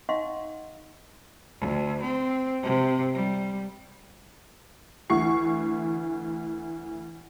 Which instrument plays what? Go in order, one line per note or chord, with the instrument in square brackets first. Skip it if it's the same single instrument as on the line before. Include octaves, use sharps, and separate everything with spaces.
[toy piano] D#4 D#5 F5 F#5 C6 C#6
[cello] D2
C4
C3
G3
[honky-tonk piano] D2 E3 C#6 C7